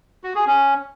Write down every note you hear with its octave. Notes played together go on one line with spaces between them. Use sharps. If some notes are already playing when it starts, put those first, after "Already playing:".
F#4
G#4
C#4